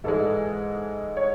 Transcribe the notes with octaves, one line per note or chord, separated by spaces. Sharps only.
G#2 E3 G#3 A4
C#5